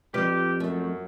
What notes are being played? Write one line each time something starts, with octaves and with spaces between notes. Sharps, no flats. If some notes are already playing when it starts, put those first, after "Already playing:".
C2 F2 F4 G4 B4 D5
F#2 A3